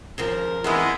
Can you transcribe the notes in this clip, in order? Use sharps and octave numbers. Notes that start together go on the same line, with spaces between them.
D#2 C#3 F3 A#4
C3 D#3 E3 G#3 B3 E4